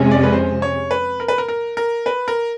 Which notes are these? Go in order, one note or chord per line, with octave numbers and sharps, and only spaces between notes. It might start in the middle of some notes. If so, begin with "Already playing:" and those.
Already playing: F2 C3 F3 G#3 C#4
D5
B4
C5
C#5
B4
A#4
B4
A#4
A#4
A#4
B4
A#4